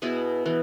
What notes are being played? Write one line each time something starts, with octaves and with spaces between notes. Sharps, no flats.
B2 B3 E4 G#4
E3 B3